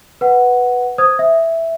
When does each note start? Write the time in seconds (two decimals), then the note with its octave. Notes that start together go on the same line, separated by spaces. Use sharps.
0.21 B4 F#5
0.98 C5 D#6 G#6
1.19 E5